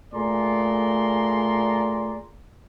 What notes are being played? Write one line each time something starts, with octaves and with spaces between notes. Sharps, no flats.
A#2 A3 G#4 D5 A#5 C6